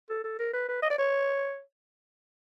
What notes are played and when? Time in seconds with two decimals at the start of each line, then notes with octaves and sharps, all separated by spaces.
0.10 A4
0.24 A4
0.39 A#4
0.53 B4
0.68 B4
0.82 D#5
0.90 D5
0.98 C#5